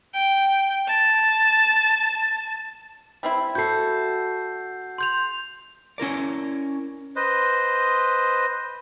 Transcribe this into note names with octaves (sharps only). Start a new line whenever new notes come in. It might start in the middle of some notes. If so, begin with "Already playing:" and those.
G5
A5
G3 C4 E4
F#4 A4 G6 C7
C6 G6 F7
C#4 E4 A#4 D5
B4 C5 D#5